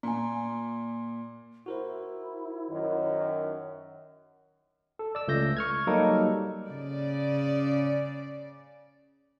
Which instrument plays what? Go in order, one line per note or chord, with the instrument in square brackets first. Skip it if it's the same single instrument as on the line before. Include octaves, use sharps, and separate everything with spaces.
[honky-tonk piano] A#2 [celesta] G#5 A#5
[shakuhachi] E4 [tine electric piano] F#4 A#4 C5
[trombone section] F#2 D#3
[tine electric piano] A4
D5 E6
C#2 A3 G6 A#6
C#6 F6 G#6
F#3 G3 A#3 D#4 A4 A#4
[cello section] C#3 D5